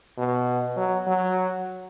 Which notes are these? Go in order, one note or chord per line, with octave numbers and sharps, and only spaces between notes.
B2
F#3
F#3